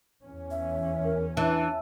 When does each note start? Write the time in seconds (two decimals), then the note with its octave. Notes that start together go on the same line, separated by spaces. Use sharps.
0.22 E2 C#4
0.51 E5
1.04 A#4
1.37 E3 D4 A5